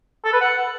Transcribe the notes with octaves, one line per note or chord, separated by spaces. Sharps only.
A4
B4
F#5